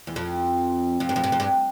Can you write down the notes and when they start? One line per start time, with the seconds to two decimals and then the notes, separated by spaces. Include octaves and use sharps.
0.07 E2
0.16 F2
1.00 F2
1.09 G2
1.16 F2
1.24 G2
1.32 F2
1.40 G2